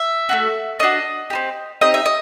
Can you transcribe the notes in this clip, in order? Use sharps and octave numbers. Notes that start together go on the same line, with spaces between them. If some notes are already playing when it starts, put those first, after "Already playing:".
Already playing: E5
A3 D4 F#4
A3 D4 F#4 D#5
C4 D#4 G4
C4 D#4 G4 D#5
E5
D#5